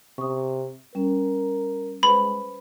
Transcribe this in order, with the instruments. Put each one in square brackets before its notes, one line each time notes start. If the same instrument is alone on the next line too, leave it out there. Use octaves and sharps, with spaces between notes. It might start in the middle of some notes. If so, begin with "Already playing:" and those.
[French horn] C3 [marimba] C#6 D#6
[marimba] G3 C#4 [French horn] A#4
[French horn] G#3 [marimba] B4 C5 [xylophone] B5